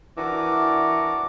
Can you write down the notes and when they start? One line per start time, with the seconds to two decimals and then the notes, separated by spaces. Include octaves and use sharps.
0.17 E3 D4 F#4 A#4 D6